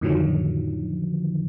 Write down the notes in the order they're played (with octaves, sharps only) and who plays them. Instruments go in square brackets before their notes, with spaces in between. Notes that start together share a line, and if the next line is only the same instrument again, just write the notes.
[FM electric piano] F2 A2 D3 D#3 F3 F#3